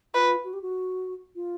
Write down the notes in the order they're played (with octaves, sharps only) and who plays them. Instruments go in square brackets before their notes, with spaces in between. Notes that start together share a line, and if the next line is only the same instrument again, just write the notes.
[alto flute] F4 [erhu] B4
[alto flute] F#4
G4
F#4
F4